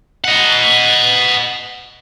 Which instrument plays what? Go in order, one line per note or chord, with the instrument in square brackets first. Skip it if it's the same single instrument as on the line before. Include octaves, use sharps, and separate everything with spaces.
[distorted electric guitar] D#5 F#5